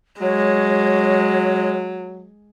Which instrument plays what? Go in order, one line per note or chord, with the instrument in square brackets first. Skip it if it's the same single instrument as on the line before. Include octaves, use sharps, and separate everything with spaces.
[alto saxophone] F#3 [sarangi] G#3 [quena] C#5